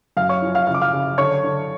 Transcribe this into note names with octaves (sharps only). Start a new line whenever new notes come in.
F#2 F5 F6
C#5 C#6
F3
F5 F6
C#3 F6
D6
F5 F6
C#3
D3 C#5 C#6
D3